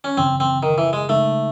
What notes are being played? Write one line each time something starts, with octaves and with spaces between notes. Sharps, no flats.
C#4
F#2 C#3 E3 C4
C4
D#3
E3
G#3
C#3 G#3 A3 D#4